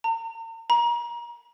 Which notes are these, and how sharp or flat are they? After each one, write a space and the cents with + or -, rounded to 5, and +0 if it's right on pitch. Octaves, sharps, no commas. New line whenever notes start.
A#5 -45
A#5 +30